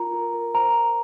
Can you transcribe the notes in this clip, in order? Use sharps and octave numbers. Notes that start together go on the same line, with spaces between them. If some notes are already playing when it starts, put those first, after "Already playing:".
Already playing: F4 A#4 A#5
A#4
A#4
C5 A#5